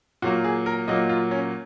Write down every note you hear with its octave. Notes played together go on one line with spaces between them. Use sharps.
A#2 F#3 A#3 F#4
G#4
A#4
A#2 F#3 A#3 D#5
F4
C#4